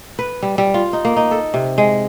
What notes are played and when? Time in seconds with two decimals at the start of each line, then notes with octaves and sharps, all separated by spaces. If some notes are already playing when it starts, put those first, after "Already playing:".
0.19 B4
0.43 G3
0.58 G3
0.74 F4
0.93 D#4
1.05 A#3
1.17 D#4
1.31 A4
1.54 C3
1.78 G#3